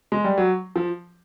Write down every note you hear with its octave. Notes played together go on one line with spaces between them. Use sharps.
G#3
G3
F#3
F3